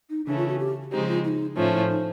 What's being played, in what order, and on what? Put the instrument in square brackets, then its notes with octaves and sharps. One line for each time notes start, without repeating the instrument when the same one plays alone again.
[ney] D#4
[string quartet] C#3 E3 A3 C#4 [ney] D4
[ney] F4
F#4
G4
[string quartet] C#3 F3 G#3 C4 D#4 [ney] G4
[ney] F4
E4
D#4
[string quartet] A2 F3 A3 C#4 [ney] F4
[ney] E4
D#4